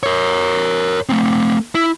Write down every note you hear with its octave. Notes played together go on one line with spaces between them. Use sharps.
A#4 C#5
A3 C4
E4